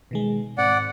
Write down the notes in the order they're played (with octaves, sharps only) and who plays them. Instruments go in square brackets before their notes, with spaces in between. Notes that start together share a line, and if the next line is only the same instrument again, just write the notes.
[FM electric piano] B2 D#3 G#3
[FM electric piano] G#2 C4 [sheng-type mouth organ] D5 F#5